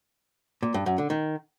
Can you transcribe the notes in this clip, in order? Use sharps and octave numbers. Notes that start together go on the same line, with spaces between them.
A#2
G2
F#2
D3
D#3